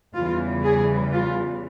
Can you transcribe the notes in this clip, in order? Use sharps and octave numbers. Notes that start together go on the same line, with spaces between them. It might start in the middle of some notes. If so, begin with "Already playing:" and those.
E2 C#3 E3 G3 F4
G#4
F4